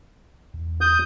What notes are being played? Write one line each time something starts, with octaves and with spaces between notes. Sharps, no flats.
E2
D#6 G6